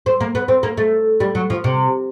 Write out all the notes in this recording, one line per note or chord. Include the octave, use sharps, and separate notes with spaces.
C4
A#3
B3
C4
A#3
A3
G3
F#3
F3
C3